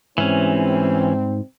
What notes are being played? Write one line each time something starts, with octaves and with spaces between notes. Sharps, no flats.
G#2 C3 E3 G3 C4 C#4